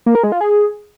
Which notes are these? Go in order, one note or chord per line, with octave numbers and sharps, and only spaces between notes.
A#3
A#4
G#3
F4
G#4